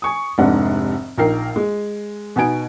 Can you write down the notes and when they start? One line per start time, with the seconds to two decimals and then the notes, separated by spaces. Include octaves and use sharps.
0.02 G#5 C#6 D#6
0.38 F1 G#2 C3 D4 F#5
1.18 A#1 D#4 A#4 G5 C7
1.56 G#3
2.36 B2 B3 D#4 G#5 D7